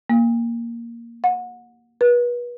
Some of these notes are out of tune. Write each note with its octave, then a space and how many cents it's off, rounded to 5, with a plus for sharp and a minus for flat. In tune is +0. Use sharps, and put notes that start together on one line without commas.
A#3 +0
F#5 -30
B4 -35